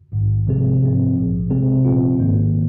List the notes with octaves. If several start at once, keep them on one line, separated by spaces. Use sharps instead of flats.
A#1 G#2 D#3
C3 F3 G#3 C4 G#4
G#2 F3 C4
A#1 A#2 F3
C3 G#3 C4 G#4
A#2 F3 C4 F4
G#1 G#2 D#3 A#3